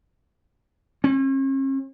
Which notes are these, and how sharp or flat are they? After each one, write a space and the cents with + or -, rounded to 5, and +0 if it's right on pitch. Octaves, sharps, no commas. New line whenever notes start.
C#4 -45